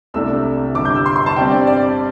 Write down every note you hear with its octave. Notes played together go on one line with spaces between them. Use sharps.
C2 C3 A3 D4 E6
G1 G2 G3 D4 D6
G6
E6
C6
C6
A5
G2 G3 C4 G5
D5
D5